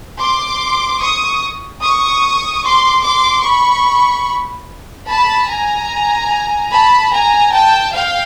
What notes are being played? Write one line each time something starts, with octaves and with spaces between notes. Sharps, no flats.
C6 D6
C#6 D#6
C#6 D#6
C6 D6
C6 D6
B5 C#6
A5 B5
G#5 A#5
A5 B5
G#5 A#5
G5 A5
F5 G5